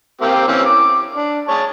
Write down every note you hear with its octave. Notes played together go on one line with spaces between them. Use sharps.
A#3 C4 G4
E3 C4 C#4
D6
D4
G#4 C#5 A5